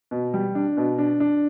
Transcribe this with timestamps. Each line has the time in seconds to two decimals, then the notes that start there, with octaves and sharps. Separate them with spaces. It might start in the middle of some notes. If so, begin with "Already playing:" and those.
0.11 B2
0.34 G3
0.55 D4
0.77 B2
0.98 D4
1.20 D4